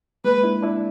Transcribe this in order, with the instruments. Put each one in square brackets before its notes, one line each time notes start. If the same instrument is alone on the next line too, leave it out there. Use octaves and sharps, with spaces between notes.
[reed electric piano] G#3 A#3 [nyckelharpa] B4
[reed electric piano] D4 E4
D4 E4